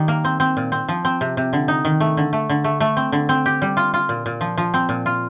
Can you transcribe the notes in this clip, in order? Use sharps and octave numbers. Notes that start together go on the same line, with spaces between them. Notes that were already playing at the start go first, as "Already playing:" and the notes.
Already playing: D#3 G3
A#3
C4
C4
A#2
C4
F3
C4
C3
C3
D3
D#4
D#3
A3
D3
A3
D3
A3
A3
C4
D3
C4
G4
G3
F4
F4
A#2
A#2
F3
F3
C4
A#2
F4